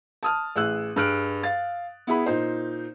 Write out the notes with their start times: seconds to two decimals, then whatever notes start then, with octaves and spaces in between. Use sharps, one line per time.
0.23 A5 D#6 F6
0.56 A1 G#4 E6 F#6
0.96 G2 G#4 F6 F#6 D7
1.43 F5 A6
2.07 B3 E4 G#4 B5
2.26 A#2 D#4 C5